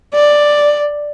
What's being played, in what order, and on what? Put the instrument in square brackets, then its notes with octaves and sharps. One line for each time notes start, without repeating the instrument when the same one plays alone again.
[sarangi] D5